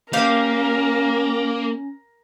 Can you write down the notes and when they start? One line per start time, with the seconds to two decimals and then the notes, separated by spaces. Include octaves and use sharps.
0.13 A#3 C#4 G4 A#4 F5